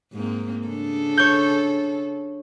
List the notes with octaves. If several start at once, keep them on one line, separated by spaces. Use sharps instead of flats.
G#2 A#3 C4
C#3 D4 A4
C#5 G6